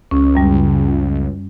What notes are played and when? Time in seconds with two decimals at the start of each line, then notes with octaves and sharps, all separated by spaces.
0.11 C#2 C#4
0.35 F#2 G3